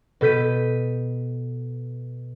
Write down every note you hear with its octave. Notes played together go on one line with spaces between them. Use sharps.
B2 A4 G6 B6 D#7